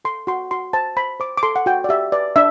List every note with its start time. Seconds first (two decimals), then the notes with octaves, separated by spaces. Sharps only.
0.05 A4 C6
0.27 F#4 C6
0.51 F#4 C6
0.73 C5 A5
0.96 C5 B5
1.20 C5 D6
1.38 D6
1.43 A4 C6
1.56 F#5
1.66 F#4 G5
1.84 D5
1.89 G4 E5
2.12 B4 D5
2.36 D4 E5